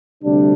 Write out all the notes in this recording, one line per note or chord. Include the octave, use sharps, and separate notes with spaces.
D2 C3 G3 D4